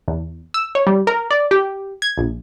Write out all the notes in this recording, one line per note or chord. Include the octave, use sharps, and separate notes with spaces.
E2
E6
C#5
G3
A#4
D5
G4
G#6
A#1